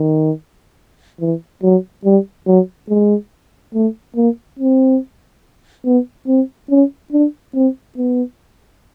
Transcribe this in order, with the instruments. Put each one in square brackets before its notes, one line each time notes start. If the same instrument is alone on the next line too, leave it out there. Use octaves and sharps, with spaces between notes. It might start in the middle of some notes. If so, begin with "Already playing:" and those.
Already playing: [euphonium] D#3
E3
F#3
G3
F#3
G#3
A3
A#3
C4
B3
C4
C#4
D4
C4
B3